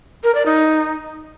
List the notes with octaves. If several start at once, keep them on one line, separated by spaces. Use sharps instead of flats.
A#4
D5
D#4